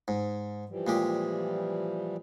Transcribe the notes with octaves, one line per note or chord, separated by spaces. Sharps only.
G#2
E3 F3 G3
A#2 G#3 G4